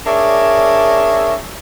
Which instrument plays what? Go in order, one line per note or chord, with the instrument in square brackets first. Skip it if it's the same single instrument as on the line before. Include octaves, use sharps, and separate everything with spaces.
[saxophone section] D4 G#4 A#4 C#5 D5 E5